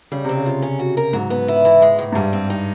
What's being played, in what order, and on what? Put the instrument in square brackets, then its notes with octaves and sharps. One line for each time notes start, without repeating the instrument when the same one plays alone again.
[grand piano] C#3 [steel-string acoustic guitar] G3
[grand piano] C3 [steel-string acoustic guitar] C4
[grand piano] C#3
[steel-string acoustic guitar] F4
C#4
F#4
A#4
[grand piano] G#2 [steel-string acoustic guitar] F#3
[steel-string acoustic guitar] B3
E4
E3
G#3
A2
[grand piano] G#2
[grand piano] G2 [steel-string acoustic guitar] G3
[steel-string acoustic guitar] C4
D#4